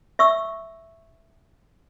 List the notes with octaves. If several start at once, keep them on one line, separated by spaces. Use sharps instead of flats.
E5 C#6 E6